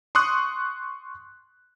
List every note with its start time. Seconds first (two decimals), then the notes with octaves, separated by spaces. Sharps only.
0.15 C6 C#6 D#6 F#6